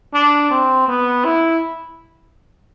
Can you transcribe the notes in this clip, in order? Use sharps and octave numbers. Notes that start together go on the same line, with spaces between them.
D4
C4
B3
E4